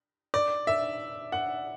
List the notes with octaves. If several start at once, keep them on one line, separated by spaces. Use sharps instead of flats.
D5
E5
F#5